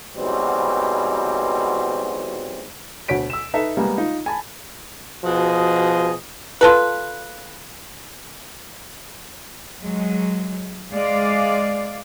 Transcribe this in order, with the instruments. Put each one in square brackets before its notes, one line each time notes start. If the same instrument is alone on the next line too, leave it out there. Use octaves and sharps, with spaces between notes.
[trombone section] G#2 B2 E3 F#3 G3 C4
[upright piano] D2 B2 C#5 B6 D7
E6 E7
D#4 A4 B4 E5
G3 G#3 A#3 B3
D#4 F4
G#5 A5 B5
[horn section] B2 F3 F#4 G#4 D#5
[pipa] F4 A4 B4
[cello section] F#3 G#3
G#3 D5 F5